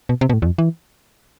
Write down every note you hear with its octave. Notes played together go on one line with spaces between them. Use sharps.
B2
C3
B2
A2
E2
F2
E3